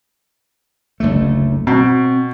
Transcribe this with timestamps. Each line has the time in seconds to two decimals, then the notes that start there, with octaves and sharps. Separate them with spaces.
1.00 F#1 D2 A3
1.67 B2 C4